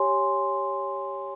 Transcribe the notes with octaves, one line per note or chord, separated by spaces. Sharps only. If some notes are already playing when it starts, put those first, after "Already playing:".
Already playing: G4 C#5 G#5 C6